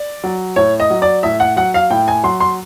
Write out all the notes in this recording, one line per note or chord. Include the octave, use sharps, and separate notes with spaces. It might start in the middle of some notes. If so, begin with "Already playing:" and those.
Already playing: D5
F#3
A2 C#5
D#5
F#3
D5
A2 E5
F#5
F#3 F#5
F5
A2 G5
G#5
F#3 C6
C6